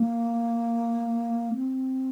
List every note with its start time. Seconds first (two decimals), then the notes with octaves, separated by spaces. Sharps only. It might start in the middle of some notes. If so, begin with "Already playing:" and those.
Already playing: A#3
1.55 C4